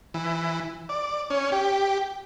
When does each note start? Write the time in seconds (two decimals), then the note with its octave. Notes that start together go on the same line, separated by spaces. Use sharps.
0.14 E3
0.89 D5
1.30 C#4
1.52 G4